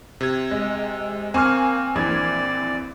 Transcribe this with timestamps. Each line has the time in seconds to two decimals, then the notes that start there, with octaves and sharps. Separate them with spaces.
0.21 C3 G#6
0.51 G#3
1.34 A#3 C4 G#5 C#6 F6
1.95 A#1 E3 D5 G#6